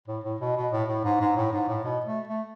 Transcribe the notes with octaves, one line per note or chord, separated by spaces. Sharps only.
A2
A2
B2
B2
A2
A2
G#2
G#2
A2
G#2
A2
B2
A3
A3